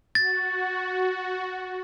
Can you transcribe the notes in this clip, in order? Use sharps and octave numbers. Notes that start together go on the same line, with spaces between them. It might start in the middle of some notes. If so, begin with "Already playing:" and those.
F#4 A6